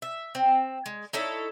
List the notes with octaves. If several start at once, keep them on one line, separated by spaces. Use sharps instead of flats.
E5
C4
G#3
D#4 E4 A4 C#5